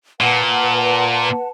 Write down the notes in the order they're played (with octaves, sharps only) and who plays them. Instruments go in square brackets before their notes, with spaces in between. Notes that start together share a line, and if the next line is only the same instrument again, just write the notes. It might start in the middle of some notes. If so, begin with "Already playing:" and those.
[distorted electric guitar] A#2 [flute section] B4 F#5 A5